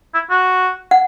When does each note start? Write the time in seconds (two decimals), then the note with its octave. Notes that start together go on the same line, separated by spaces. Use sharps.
0.15 E4
0.31 F#4
0.91 F#5